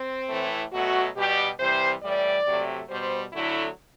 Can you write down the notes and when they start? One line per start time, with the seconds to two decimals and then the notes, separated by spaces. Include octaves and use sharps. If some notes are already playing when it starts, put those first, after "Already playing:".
Already playing: C4
0.29 A2 E3 A3
0.72 B2 F#3 A3 F#4
1.16 B2 G3 G4
1.60 C3 E3 G3 C5
2.02 A2 E3 G3 D5
2.46 C3 F#3 A3
2.89 B2 G3 C5
3.32 D3 F#3 A3 E4